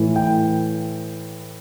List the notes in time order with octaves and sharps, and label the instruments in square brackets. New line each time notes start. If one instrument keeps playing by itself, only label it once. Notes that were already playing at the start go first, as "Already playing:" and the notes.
Already playing: [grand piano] A2 E3
G5